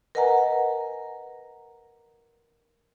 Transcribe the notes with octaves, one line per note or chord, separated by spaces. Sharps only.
A#4 B4 D#5 F#5 G#5 A#5